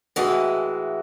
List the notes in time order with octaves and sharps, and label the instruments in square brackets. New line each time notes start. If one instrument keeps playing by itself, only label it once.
[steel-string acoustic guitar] A2 E3 G#3 [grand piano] F#4